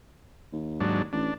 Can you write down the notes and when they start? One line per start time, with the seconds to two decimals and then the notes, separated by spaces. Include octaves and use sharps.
0.53 D#2
0.80 G#2 F#3 D4
1.13 A1 D4